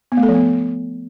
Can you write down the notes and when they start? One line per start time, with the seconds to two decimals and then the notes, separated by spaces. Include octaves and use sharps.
0.12 B3
0.17 A3
0.23 A4
0.29 F3
0.34 B3